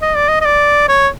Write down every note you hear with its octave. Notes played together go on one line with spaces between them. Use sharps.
D#5
D5
D#5
D#5
D5
C#5